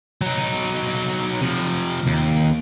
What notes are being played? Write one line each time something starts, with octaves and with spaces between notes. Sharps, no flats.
F#3 D#4
C3 F3
D#2